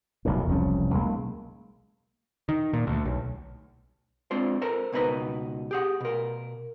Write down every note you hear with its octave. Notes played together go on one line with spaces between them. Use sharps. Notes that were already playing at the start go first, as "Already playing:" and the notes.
F1 B1 A2
E1 C2 F3 C#4
B1 G#3 A#3
D#3
A#2
D2
B1
G#3 C4 D4 F4 C5
A4 A#4 C5 A#5
C#2 B2 D#4 B4 A#5
G4 G#4 F#5
B2 A#4